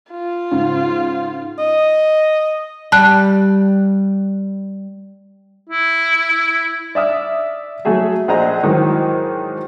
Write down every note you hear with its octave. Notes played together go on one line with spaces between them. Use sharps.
F4
G#2 C#3
D#5
G3 A5 F#6
E4
D5 E5 D#6 F6
F#3 A3 F#4 G#4 E5
A#1 G#4 C5 D#5 A#5
G#2 D#3 E3 F#3